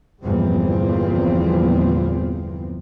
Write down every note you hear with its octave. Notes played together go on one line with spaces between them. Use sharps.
G1 E2 G2 A#2 F3 C4